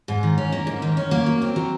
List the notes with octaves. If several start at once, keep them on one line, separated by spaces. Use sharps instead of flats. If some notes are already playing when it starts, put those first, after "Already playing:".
G#2
D#3
C#4
A#3
G#2
D#3
C#4
A#3
F#3
C4
F#3